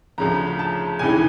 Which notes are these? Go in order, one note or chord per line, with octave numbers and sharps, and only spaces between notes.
D2 C#3 F3 A#5
A5
E1 D#2 C#3 E3 G#5